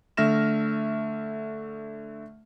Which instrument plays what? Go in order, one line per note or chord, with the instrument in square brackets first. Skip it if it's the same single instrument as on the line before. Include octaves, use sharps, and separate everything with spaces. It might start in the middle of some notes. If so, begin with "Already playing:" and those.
[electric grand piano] D3 A3 E5 F6 A#6 E7